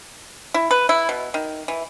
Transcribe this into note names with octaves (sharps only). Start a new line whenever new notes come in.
E4
B4
E4
B2
D#3
E3